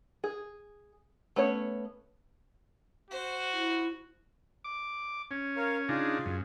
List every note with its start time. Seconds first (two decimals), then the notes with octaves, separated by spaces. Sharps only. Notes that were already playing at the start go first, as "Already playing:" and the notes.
0.24 G#4
1.36 A3 B3 C#4 C#5
3.11 F#4 C5
3.53 E4
4.65 D6
5.31 C#4
5.56 A#4 C#5 F5
5.89 C#3 D4 D#4 F4 G#4
6.26 F#2